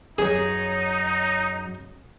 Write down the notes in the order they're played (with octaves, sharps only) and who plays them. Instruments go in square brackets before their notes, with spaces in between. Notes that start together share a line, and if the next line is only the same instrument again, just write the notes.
[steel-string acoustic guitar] F#2 F#3 [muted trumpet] D#4 [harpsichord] G#4